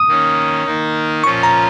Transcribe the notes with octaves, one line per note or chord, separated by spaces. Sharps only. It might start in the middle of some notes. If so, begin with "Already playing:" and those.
Already playing: D#6
D#3 A#3 C#4
D#3 A#3 D#4
A#2 F3 C#4 F4 C#6
A#5